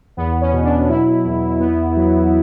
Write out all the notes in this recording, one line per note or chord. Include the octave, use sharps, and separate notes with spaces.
E2 B3
C#4
B2
D4
F#3 E4
E2
B3
F#3